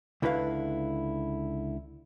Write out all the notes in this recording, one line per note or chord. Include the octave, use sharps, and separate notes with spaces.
C#2 D3 E4 F#4 B4 F5